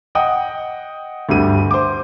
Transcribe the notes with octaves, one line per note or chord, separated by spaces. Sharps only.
D#5 F#5 G5 D#6
D2 G2 G4 D#7
C5 D6